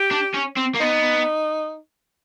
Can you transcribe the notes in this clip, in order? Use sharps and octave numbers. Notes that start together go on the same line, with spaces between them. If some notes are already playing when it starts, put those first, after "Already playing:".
Already playing: G4
D4
C#4
C4
A#3
B3 D#4